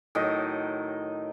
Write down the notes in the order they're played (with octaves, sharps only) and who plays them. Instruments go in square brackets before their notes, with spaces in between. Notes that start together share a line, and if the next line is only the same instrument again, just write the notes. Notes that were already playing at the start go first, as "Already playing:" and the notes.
[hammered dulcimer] A2 D#3 F#3 D#5